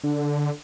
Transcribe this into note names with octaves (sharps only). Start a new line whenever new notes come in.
D3